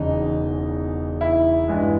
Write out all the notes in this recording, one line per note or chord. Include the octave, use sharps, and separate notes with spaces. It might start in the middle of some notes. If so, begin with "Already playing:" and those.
Already playing: E1 E2 C#3 D#4
E4
G2 E3 G#3 B3